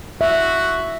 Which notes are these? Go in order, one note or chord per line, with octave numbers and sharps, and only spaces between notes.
F#4 E5